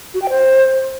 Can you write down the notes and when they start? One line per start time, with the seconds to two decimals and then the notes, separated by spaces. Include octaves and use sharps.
0.14 F#4
0.22 G5
0.30 C5